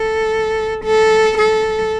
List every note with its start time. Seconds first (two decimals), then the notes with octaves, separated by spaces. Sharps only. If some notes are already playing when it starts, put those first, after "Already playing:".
Already playing: A4
0.85 A4
1.39 A4